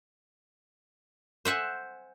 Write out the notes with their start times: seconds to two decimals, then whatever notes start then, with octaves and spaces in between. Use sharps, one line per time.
1.45 C5 E5 F#5 G#5